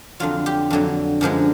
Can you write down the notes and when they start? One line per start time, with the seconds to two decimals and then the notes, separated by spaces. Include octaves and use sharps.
0.20 F2 D3 F#3 F4
0.46 G4
0.70 F2 D3 F#3
1.21 F#2 D3 F3 G#3